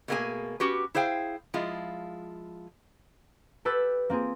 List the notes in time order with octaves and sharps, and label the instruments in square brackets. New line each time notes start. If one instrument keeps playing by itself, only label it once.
[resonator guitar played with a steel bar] B2 A3 A#3 F4 G#4 G#5
C#4 F#4 G4 B4
E4 G#4 C5 F5 G5
F3 G#3 E4 F4
[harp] G4 A4 B4 E6
A#3 C4 F4 G#4